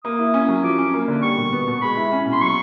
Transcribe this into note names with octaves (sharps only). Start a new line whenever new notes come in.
A#3 D#6
E4
C#4
F#3
F3 D6
C#4
A#3
D3
G3 C#6
B2
B3
B2
G#3 B5
E4
C#4
B2
C6
F#3 C#6